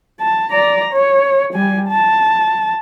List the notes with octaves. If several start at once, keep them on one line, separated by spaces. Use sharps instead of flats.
A5
D5 A#5
C#5
G3 G#5
A5